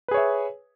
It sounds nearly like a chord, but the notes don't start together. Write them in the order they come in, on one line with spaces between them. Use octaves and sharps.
B4 G#4 C#5 E5